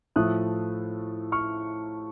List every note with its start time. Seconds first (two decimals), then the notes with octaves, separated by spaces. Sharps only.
0.16 A2 F3 A3 D#6 F#6
1.32 C#6 F6